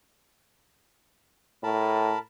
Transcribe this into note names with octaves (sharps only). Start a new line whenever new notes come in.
A2 A#4 A5 B5